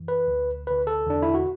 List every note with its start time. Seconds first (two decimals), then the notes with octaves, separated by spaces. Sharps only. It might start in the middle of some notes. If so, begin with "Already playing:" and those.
Already playing: F#2 E3
0.08 B4
0.27 D2 D3
0.67 D2 D3 B4
0.87 A4
1.07 E2 D3 D4
1.22 E4
1.34 F#4